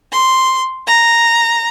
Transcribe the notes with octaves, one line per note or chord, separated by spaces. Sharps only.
C6
A#5